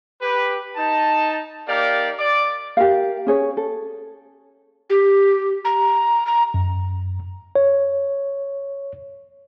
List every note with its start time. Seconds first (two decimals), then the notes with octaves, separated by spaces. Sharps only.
0.22 G4 B4
0.76 D#4 A5
1.68 A#3 D#4 G4 A#4 D5 F5
2.19 D5 D6
2.77 G4 A#4 F5
3.26 C#4 G#4 C#5
3.57 A4
4.90 G4
5.65 A#5
6.26 A#5
6.54 F#2
7.56 C#5